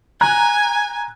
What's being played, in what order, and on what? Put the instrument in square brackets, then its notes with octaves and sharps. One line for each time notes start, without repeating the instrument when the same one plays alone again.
[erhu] G#5 [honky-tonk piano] A#5 F#6 G#6